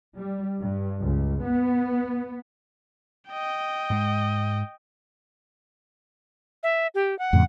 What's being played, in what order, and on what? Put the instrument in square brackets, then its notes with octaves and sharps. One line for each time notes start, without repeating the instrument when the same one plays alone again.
[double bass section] G3
G2
C#2
B3
[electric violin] D#5 G5
[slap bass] G#2 G#3
[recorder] E5
G4
F#5
[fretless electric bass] F2 A2 C#3